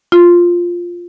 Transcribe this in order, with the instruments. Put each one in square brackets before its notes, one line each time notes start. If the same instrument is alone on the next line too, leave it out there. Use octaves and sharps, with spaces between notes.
[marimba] F4